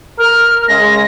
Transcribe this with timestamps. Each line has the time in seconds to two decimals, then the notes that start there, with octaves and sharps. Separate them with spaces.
0.18 A#4 F6
0.68 C#3 G#3 A#6